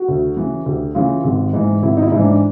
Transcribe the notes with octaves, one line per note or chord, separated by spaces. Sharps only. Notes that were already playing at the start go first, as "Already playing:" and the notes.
Already playing: F#4
D2
C#3 E3
D2 G4
C#3 E3 F4
G#1
G#2 E3
G#1 E4
D#4
E4
G#2 E3
D4